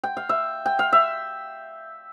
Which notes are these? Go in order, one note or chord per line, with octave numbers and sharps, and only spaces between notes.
G5
F5
E5
G5
F5
E5